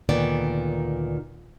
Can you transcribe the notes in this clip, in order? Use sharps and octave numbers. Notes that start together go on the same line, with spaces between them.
D2 A#2 D#3 B3 D5